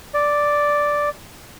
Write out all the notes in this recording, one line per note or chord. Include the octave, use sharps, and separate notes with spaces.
D5